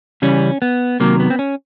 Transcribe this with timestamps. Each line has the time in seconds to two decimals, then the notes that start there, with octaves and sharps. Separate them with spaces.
0.22 C#3 E3 G3 C#4
0.62 B3
1.00 C3 D#3 F#3 A#3
1.20 B3
1.30 C4
1.39 C#4